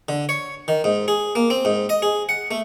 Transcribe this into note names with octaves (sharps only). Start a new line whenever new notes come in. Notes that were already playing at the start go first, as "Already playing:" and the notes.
D3
C#5
D#3
G#2
G#4
A#3
C4
G#2
D#5
G#4
F#5
A3